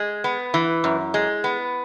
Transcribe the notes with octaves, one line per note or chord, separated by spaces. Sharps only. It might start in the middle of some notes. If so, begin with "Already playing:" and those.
Already playing: G#3
B3
E3
F#2
G#3
B3